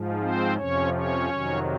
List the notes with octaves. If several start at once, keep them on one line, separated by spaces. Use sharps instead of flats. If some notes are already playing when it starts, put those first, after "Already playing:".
Already playing: G#2 F3
C4 C5
F2 C3 F3 C#4 C#5
C#4 C#5
F2 C3 D#3 F#3